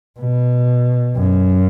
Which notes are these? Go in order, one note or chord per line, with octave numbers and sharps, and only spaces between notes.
B2
F#2